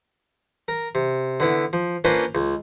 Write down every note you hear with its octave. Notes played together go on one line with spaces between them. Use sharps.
A#4
C3
D3 B3 E4
F3
A#3 C#4 D4 F4 B4 C5
C#2